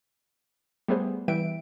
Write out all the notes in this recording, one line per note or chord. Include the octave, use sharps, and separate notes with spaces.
G3 A3 B3 G#4 C5
E3 G3 B4 E5 G5 D7